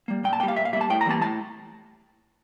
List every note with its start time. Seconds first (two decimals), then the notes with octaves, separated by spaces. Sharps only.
0.08 G3 A#3
0.24 A#2 G5
0.33 A5
0.40 G3 A#3 G5
0.48 F5
0.56 A#2 E5
0.65 F5
0.73 G3 E5
0.76 A#3 A5
0.90 A2 G5
1.01 A#5
1.06 E3 G3 A#3 A5
1.22 A2 A5